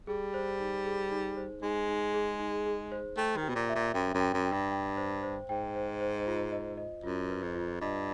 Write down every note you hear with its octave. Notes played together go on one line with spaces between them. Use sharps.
G3 G#4
C5
D#4
G#4
D#4
C5
G#3 D#4
D#4
G#4
D#4
G#4
C5
A3 G5
D#3
G4
B2
A#2
E5
A#2
F#2 G5
F#2
G5
F#2
G5
G2
G5
C5
C5
G#2 G5
C5
C5
F4
D#5
D#5
F#2 F4
B4
F2
F4
G2 D#5